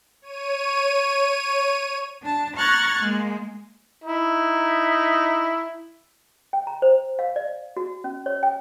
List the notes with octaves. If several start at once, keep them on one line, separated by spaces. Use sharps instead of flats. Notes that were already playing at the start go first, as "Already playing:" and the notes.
C#5 D#7
D4 A5
A#5 C#6 F6 F#6 G#6 A6
G#3 A#3
D#4 E4
G5
A#5
C5
F5
D5
F#4
C#4
C#5
G5